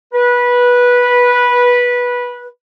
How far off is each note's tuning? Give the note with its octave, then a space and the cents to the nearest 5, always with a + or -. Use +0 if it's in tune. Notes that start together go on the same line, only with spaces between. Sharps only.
B4 -15